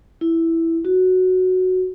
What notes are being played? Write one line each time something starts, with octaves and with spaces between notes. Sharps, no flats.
E4
F#4